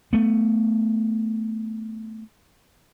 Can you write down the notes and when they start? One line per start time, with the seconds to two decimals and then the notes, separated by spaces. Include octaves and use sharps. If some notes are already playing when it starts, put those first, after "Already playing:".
0.13 A3 B3